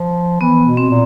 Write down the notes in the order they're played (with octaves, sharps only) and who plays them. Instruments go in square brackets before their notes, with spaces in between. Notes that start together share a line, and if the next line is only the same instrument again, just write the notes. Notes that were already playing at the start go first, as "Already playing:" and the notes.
Already playing: [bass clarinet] F3
[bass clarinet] E3 [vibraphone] B3
[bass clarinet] B2
[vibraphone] C4
[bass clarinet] A#2